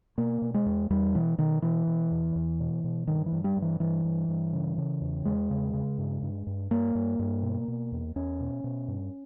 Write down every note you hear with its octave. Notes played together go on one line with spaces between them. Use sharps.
B2 A#3
B2
G#3
E2
E2 G3
B2 E3
B2 D#3
B2 E3
B2
E2
E2
B2
B2
G2 D#3
E3
G2
G3
G2
E3
G2 E3
G2
G2
C#3
C#3
E2
E2 G#3
C#3
C#3
G2
G2
G2
G2 A#3
G2
G2
B2
B2
E2
E2 C#4
B2
B2
G2